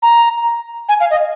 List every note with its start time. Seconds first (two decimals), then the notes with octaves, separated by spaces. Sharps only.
0.02 A#5
0.89 G#5
1.00 F5
1.11 D#5